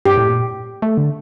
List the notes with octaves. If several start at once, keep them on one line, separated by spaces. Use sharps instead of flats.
G2 G4
A2
A#2
A3
D3